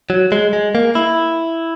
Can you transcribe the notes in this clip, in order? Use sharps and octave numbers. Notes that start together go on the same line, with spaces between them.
F#3
G#3
G#3
A#3
E4